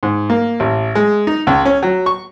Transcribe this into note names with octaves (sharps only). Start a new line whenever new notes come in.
G#2
A#3
A1
G#3
D#4
C#2
C#4
F#3
C#6